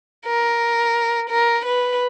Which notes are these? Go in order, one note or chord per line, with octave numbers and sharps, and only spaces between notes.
A#4
A#4
B4